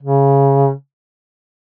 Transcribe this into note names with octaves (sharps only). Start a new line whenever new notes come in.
C#3